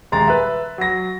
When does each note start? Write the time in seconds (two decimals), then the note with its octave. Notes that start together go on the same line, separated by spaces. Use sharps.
0.12 D#1 G#3 A#5 C6 A6
0.27 B4 E5
0.78 F#3 A#6